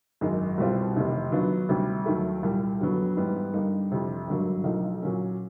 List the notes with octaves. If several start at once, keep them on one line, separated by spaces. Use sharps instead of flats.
G#1 F#2 D#3 G#3
C2 B2 G3 C4 F4
F1 E2 C3 D#3
D#3 F#3 B3 D4 F4
D2 C3 D#3 G3
D#2 D#3 F#3 A3
C2 A#2 G3
F2 D3 F#3 B3
G#2 E3 G3 B3
G2 D3 G3 A#3 D#4
F2 C3 E3
G#1 G2 D3 F#3 A#3
B1 A2 F3 A#3 D#4
A#2 F#3 A#3 C#4